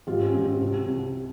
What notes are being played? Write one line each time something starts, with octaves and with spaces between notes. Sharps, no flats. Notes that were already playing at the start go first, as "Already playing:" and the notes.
G#1 F4 G4
C#4
G#1 C4
C4
C2
C2